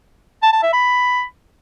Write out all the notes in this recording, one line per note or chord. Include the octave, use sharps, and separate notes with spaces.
A5
A5
E5
B5